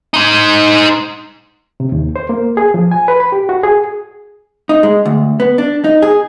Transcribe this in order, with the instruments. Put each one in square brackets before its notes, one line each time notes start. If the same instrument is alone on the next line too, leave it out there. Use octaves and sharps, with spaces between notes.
[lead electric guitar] D#4 C5
[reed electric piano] C3
D#2
C5
A#3
G#4
F3
G#5
B4
B5
G4
F#4
G#4
[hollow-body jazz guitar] D#4
G#3
D2
B3
D4
D#4
G#4